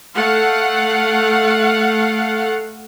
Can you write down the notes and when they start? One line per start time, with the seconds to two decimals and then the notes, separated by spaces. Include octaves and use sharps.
0.16 A3 F5 F#5